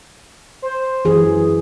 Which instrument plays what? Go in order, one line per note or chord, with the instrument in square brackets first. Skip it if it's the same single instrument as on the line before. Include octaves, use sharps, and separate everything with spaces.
[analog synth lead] C5
[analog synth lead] F#2 [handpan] E3 G#4